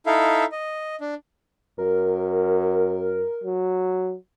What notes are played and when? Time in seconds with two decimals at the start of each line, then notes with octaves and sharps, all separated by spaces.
0.06 D#4 E4 A4 E5 F5
0.52 D#5
1.01 D4
1.78 F#2 A#4
3.44 F#3